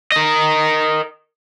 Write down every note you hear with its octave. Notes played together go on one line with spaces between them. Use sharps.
A#4 D#5